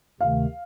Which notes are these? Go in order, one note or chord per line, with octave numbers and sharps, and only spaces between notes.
D2 C3 D#3 A3 F5